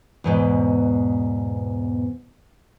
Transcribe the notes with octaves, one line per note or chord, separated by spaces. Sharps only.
E2 G#2 B2